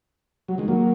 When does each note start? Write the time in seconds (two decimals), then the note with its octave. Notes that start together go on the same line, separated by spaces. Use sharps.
0.48 F#3
0.58 D#3 G#3
0.68 F#3 A#3